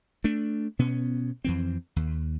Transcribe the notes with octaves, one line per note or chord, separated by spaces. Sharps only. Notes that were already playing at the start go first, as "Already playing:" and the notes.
A3 D4
B2 B3 C#4
F2 E3 C4
D#2